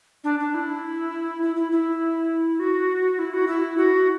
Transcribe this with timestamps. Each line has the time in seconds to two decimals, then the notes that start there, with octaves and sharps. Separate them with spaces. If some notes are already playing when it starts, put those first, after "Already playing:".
0.24 D4
0.40 D4
0.55 E4
1.43 E4
1.56 E4
1.72 E4
2.60 F#4
3.19 E4
3.34 F#4
3.48 E4
3.77 F#4